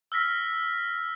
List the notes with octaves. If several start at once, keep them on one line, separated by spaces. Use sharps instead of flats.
E6 F6 A#6 B6